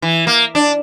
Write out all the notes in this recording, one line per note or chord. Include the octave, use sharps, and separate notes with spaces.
E3
A#3
D4